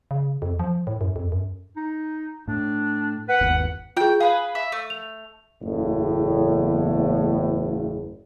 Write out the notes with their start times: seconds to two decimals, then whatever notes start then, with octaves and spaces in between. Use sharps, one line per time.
0.11 C#3
0.42 F2
0.60 F3
0.87 A2
1.01 F#2
1.16 F2
1.32 F#2
1.76 D#4
2.48 A2 D4
3.29 B4 F#5
3.41 G1 D#2
3.97 F4 G#4 G5
4.20 G#4 B4 F5
4.55 E5
4.72 A3
4.90 F7
5.62 F#1 E2 A2